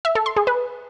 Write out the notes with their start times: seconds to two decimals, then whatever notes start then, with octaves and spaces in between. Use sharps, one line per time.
0.05 E5
0.15 A4
0.26 C6
0.36 G#4
0.47 B4